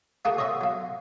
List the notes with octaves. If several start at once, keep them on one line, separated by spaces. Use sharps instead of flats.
A3 A#3 F#4 G#4 F#5 G#5
C#5 D#5 E5 C6
F#3 F5